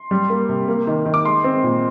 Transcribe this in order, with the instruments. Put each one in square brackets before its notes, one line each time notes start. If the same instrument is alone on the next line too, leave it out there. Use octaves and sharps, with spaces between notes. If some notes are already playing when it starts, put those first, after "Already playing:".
Already playing: [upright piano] C6
G3
A#3
C3
A#3
D#3
D#3
D6
G#3 C6
C4
A#2